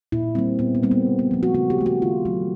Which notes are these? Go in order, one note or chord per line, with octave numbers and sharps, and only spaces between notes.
A#2 E4
G3 A#3 C4
A#2 B3
B3
G3 A#3 C4
B3
C#3
B3
F3 A3
F#4
C#3 F#4
G4
F3 A3
F#4
D#3 F4
F#3 A3